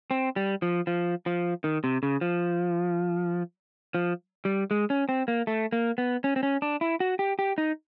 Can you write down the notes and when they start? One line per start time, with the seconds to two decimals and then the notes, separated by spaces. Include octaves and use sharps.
0.11 C4
0.36 G3
0.62 F3
0.87 F3
1.26 F3
1.64 D#3
1.84 C3
2.03 C#3
2.21 F3
3.94 F3
4.45 G3
4.71 G#3
4.90 C#4
5.09 C4
5.28 A#3
5.47 A3
5.73 A#3
5.98 B3
6.24 C#4
6.36 C4
6.43 C#4
6.62 D4
6.81 E4
7.00 F#4
7.19 G4
7.39 G4
7.58 D#4